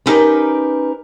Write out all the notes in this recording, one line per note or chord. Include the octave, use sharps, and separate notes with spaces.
B3 C#4 D#4 G4 A#4 B4